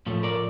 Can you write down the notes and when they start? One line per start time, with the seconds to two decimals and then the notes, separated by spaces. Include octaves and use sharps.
0.06 A2 F3 A3
0.23 A#4 D5